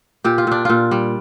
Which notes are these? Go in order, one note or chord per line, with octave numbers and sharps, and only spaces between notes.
A#2 G4
F4
A#2 D4
A#2 F4
G3